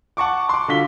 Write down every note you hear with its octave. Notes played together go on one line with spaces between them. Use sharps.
F#5 A5 C#6 D6
C6 D6
D3 F4 F#4 B6 G7